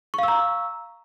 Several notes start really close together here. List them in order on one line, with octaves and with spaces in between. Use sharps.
C#6 F5 E6 A#5